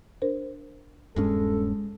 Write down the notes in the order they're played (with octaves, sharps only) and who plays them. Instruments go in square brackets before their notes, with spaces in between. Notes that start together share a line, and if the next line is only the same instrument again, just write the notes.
[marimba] D4 A#4 C5
[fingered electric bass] D#1 G2 C#4 [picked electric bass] G#3 [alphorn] A4